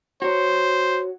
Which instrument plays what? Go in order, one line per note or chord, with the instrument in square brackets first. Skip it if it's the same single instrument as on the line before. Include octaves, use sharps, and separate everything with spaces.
[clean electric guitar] F#4 C#5 [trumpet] C5